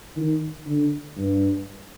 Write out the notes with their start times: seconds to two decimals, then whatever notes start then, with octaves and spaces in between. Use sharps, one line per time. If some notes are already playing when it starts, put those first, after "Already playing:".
0.16 D#3
0.66 D3
1.17 G2